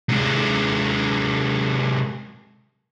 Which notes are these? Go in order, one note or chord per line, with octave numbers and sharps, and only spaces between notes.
C3 G#3